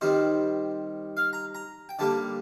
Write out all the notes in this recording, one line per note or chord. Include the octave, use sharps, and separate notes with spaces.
D#3 G3 C4 C5
F5
A#5
A#5
G5
D3 G3 A#3 A5